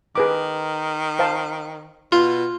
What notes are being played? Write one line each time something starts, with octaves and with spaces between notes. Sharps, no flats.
D#3 G#4 B4 D6
C5 F5 A5
B2 F4